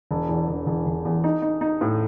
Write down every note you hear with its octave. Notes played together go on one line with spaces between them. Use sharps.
E1
E2
E1
E1
E1
E2
D#4
D#4
D#4
A2